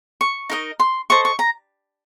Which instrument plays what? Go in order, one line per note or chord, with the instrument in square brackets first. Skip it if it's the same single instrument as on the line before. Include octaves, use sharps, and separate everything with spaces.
[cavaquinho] C#6
D#4 A#4 D#5
C6
A4 C5 D#5 C#6
C#6
A#5